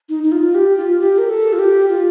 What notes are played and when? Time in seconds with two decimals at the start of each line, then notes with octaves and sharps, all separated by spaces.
0.09 D#4
0.24 D#4
0.32 F4
0.55 G4
0.77 F4
1.00 G4
1.18 A#4
1.30 A4
1.53 F4
1.59 G4
1.90 F4